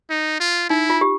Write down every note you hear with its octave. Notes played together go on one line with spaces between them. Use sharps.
D#4
F4
D#4 E4
F4
G4